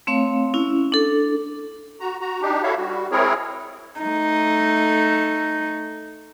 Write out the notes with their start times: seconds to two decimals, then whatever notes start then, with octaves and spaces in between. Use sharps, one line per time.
0.07 A3 C4 C#5 F5
0.54 C#4 E4
0.92 D4 A4
2.00 F#4 A#5
2.21 F#4 A#5
2.42 D4 D#4 G4
2.63 E4 F#4 A4 C#5 E5 F5
2.77 G3 F#4
3.11 G#3 C4 E4 G#4 A#4 C#5
4.00 A3 D#4